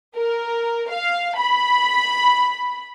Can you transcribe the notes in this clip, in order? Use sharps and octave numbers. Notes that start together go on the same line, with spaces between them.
A#4
F5
B5